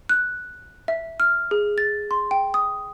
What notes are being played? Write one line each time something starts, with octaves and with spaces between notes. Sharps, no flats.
F#6
E5
F6
G#4
A6
C6
G5
D#6